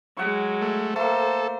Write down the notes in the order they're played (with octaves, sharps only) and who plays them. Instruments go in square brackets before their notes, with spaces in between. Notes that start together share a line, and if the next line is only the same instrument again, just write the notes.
[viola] F#3 G#3 [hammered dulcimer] F#5 C#6
[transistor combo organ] A3
[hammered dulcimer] A3 A#3 [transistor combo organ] A4 [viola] C5